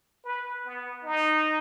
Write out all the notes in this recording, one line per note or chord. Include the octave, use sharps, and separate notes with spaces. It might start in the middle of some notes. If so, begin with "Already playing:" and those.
B4
B3
D#4